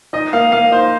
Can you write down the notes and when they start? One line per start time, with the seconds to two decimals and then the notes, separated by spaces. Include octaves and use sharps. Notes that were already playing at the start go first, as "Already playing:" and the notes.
0.13 D#4 D#5
0.33 A#3 F5
0.52 A#3 F5
0.71 D#4 C5